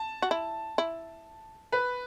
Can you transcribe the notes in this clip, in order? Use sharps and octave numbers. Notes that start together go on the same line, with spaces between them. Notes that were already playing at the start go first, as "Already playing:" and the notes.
Already playing: A5
F#4
E4
E4
B4